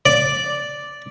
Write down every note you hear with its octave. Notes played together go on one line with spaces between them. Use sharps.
D5